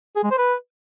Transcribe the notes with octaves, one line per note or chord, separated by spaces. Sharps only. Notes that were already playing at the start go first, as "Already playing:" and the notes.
G#4
G#3
C5
B4